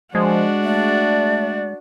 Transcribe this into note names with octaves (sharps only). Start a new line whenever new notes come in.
F3 G#3 D4 F#4
A3 D5